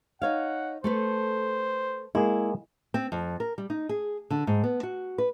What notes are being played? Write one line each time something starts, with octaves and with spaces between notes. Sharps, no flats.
D#4 C#5 F5 F#5
A3 A4 B4 C5
G#3 A#3 E4 G#4
C4
F2
A#4
G3
D#4
G#4
D3
G#2
B3
F#4
B4